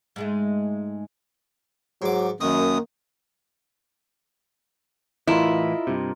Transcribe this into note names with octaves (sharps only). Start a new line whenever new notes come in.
G#2 G#3 A3
G#2 F#3 D6
F#2 D#3 A#3 D#6
A2 E3 E4 F4 A#4 D#5
G2 C3